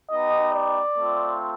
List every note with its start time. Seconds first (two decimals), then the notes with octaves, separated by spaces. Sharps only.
0.11 B3 D#4 G4 D#5
0.54 D5
0.98 A3 C4 F4